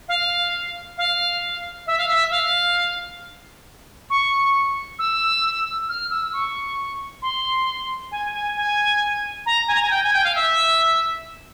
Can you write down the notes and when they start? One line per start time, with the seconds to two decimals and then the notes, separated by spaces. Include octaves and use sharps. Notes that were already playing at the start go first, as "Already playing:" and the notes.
0.08 F5
0.97 F5
1.87 E5
1.98 F5
2.08 E5
2.31 F5
4.10 C#6
4.99 E6
5.89 F6
6.11 E6
6.33 C#6
7.22 C6
8.12 G#5
8.33 G#5
8.56 G#5
9.46 A#5
9.68 G#5
9.75 A#5
9.82 G#5
9.91 G5
10.03 G#5
10.13 G5
10.24 F5
10.35 E5